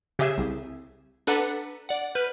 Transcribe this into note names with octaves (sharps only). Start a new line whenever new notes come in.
C#3 G4 G#4 E5 E6
C2
D4 A4 B4 F#5 A#5 C#7
D5 F#5
B4 F6 G6